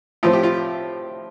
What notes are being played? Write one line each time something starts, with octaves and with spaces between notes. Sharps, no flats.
A2 F3 C4 F4
G4
F4